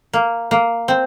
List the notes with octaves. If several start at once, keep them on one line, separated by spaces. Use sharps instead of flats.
A#3
A#3
C4